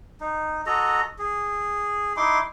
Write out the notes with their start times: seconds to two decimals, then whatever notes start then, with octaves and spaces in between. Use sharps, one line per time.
0.21 D#4
0.66 F#4 A4 D#5 A#5
1.19 G#4
2.17 D#4 E4 C6 D6